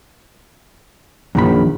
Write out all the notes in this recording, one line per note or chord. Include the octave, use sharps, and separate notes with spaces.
A#1 F#2 D#3 B5